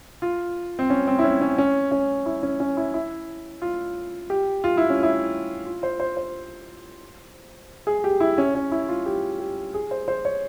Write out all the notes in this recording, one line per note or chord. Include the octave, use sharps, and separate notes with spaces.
F4
C4
C#4
C4
E4
C#4
C#4
C#4
C#4
E4
C#4
C#4
E4
E4
F4
G4
F4
E4
C#4
E4
F4
C5
C5
C5
G#4
G4
E4
C#4
C#4
E4
F4
G4
G4
G#4
C5
C5
C#5